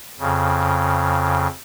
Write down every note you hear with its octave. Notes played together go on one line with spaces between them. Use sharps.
F2 C#3